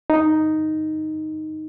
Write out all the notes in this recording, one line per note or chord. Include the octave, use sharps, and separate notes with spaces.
D#4